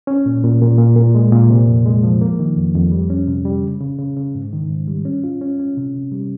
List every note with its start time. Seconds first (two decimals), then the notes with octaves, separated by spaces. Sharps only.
0.07 C#4
0.26 A#2
0.43 A#2
0.62 A#2
0.78 A#2
0.97 A#2
1.15 G#3
1.32 A#2
1.50 C3
1.67 F2
1.86 G#3
2.03 F3
2.21 A#3
2.39 D#3
2.57 F2
2.74 F2
2.92 G3
3.10 C#4
3.28 C3
3.45 G3
3.63 C#3
3.81 C#3
3.99 C#3
4.16 C#3
4.35 G#2
4.53 D#3
4.69 G#2
4.88 G3
5.05 C#4
5.24 F4
5.41 C#4
5.59 C#4
5.77 C3
5.95 C3
6.12 G3